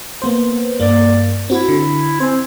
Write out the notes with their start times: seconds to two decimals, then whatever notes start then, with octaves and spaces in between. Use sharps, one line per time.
0.22 A#3 B3 C5
0.80 G2 A#3 D5
1.50 C4 E4 F#4
1.69 D3
2.20 C4 C5 G#5